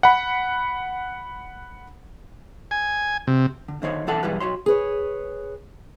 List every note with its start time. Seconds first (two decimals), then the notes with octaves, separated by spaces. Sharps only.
0.03 F#5 B5
2.71 G#5
3.27 C3
3.68 D3
3.82 D3 D#3 C5 C#5
4.07 B1 E3 A4 F#5 A5
4.23 B1 G2 E3 G3 G#4 B4
4.40 B1 F#4 C#5 C6
4.66 G#4 B4 C#5